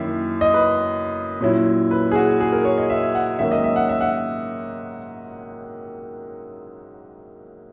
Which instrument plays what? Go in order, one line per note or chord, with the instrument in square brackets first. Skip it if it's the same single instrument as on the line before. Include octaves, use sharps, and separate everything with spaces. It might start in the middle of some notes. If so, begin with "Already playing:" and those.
Already playing: [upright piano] F#2 D#3 A#3 E4 E5
D#5
B4
A#2 F#3 C#4 E4
B4
G#4
F#4
G#4
A#4
C#5
D#5
E5
F#5
G#2 D#3 F#3 A#3 C#4 E5
D#5
E5
F#5
E5
F#5